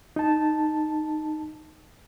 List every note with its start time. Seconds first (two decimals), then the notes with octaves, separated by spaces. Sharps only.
0.16 D#4 A5